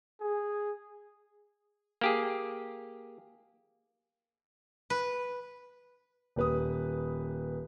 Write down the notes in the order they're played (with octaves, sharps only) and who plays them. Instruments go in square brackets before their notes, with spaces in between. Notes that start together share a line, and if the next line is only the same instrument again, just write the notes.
[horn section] G#4
[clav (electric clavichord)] A#3 G4 G#4
[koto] B4
[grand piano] D#1 B4 D#6